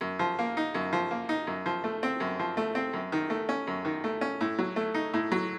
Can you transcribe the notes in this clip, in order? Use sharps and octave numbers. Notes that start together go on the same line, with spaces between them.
F#2
F3
A#3
D#4
F#2
F3
A#3
D#4
F#2
F3
A3
C4
F#2
F3
A3
C4
F#2
D#3
A3
C#4
F#2
D#3
A3
C#4
A2
F#3
A3
D#4
A2
F#3